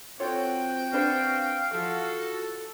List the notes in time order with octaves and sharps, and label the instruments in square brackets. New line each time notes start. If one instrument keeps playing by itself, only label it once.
[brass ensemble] C4 F#4 [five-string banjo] F4 A4 C#5 [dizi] G5
[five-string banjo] D4 B4 C5 [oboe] F5
[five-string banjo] E3 F3 [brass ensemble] F#4 [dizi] A4